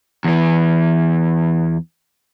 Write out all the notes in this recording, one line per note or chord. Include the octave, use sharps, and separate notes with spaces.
E2 E3